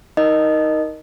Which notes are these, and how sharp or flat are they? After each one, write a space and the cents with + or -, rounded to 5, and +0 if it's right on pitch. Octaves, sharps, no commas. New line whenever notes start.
D#4 +15 A#4 +5 D#5 -15